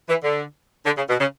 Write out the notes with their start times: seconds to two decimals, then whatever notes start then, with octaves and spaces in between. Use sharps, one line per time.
0.09 E3
0.24 D3
0.86 D3
0.97 C#3
1.09 B2
1.20 C#3